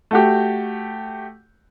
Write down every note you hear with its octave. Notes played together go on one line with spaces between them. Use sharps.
A3 F#4 G4